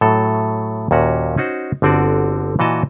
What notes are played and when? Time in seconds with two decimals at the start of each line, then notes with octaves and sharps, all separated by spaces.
0.01 A2 F#3 A4
0.91 D#2 A#2 C#4 F#4 A#5
1.37 C#4 D#4 F#4 C5
1.82 G1 D3 C4 F#4 D5
2.59 A#2 E3 F#4 D#5 A5